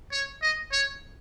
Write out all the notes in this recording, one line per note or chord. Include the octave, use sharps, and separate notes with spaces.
C#5
D#5
C#5